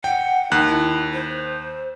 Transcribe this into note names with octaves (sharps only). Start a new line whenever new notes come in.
F#5 G5
D#2 D#4 F#6
E4
C5